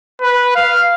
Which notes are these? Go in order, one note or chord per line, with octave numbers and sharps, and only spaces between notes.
B4
F5